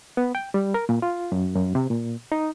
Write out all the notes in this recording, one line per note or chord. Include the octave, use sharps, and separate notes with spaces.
B3
G5
G3
A#4
A#2
F4
F#2
F#2
C3
A#2
D#4